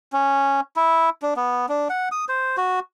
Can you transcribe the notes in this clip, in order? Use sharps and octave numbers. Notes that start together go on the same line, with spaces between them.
C#4
E4
D4
B3
D4
F#5
D#6
C5
F#4